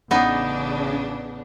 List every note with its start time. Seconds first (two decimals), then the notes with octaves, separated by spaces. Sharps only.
0.11 A1 C#3 B3 D4 D#4